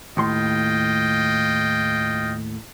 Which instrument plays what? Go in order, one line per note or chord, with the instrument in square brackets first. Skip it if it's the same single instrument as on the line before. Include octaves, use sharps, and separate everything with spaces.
[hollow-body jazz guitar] D#2 A2 C6 [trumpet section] F4 D#5 G5